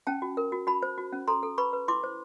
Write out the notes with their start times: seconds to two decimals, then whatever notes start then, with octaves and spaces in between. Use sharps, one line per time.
0.07 C#4 G5 A5
0.22 F#4
0.37 A#4
0.52 F#4
0.67 F#4 A5 B5
0.83 C5
0.98 F#4
1.13 C#4
1.28 A4 A#5 C6
1.43 A4
1.58 B4 B5 C#6
1.73 B4
1.88 E4 C6 D6
2.04 C5